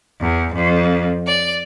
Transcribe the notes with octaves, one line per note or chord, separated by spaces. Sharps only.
E2
F2
D5